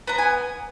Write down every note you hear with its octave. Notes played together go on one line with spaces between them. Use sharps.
B3 A#5
G#5